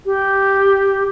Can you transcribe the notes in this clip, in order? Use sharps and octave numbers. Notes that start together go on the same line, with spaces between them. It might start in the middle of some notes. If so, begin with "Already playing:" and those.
G4